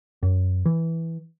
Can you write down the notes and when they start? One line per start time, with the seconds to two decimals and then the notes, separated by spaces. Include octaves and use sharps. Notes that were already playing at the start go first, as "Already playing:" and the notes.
0.23 F#2
0.66 E3